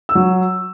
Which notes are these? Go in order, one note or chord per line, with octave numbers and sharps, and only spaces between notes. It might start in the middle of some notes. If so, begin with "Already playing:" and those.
E6
F#3